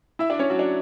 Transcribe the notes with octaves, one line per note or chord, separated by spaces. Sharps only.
E4 E5
D4 D5
C#4 C#5
F#3 F#4
D4